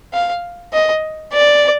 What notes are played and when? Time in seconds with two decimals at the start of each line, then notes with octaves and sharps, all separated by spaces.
0.13 F5
0.73 D#5
1.33 D5